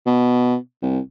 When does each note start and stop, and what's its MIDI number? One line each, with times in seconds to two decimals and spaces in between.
0.06 0.55 47
0.82 0.99 36